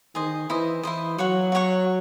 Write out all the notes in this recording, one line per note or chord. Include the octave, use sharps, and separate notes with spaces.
D#3 G#4 C5 D#5
E3 E4 C5 D#5
E3 E4 C5 D#5
F#3 F#4 C#5 F#5 C#6
F#4 C#5 F#5 C#6